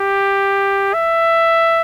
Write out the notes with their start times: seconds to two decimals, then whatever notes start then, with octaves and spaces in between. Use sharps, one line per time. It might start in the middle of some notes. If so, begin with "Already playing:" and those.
Already playing: G4
0.94 E5